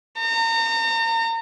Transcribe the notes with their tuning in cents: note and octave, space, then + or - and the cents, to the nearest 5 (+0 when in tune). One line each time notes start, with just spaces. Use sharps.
A#5 -35